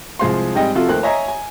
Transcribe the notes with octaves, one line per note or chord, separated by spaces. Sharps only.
C2 F3 G#3 C5 F5 C6
G#2 G3 C4 D#5 G5
C3 F3 F4 F#4 A4
D#2 A3 A#4 C5 G5 F#6
C#5 D#5 E5 G#5 A#5
G#5